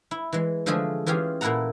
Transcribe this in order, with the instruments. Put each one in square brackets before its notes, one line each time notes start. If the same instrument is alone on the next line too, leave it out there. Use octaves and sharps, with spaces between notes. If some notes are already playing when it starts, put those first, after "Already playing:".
[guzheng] E4
E3 G#3
D3 F3 G#3 A3 G#4 A4
E3 C#4 F4 G4 G#4
A#2 A#3 E4 A4 F#5 A#5